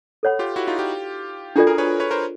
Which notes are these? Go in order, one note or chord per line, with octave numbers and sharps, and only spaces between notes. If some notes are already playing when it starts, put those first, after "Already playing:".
A4 C#5 F#5 B5
F4 G4
E4 F#4
D#4 F4
F4 G4
D4 F4 F#4 G#4 A4 D5
G#4 A#4
B4 C#5
B4 C#5
A#4 C5